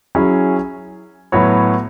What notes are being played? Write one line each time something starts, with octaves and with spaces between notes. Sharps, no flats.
F#3 C#4 E4 G#4
A2 F#3 B3 F#4 C#5